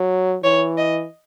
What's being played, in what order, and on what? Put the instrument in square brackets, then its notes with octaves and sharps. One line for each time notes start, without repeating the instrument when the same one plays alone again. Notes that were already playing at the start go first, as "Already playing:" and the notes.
Already playing: [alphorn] F#3
[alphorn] E3 [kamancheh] C#5
[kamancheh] D#5